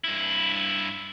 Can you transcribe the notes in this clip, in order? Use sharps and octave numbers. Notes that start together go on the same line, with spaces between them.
G2 E4